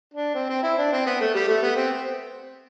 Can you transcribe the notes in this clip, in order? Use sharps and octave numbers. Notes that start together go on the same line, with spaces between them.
D4
C4
C4
E4
D4
C4
B3
A3
G3
A3
B3
C4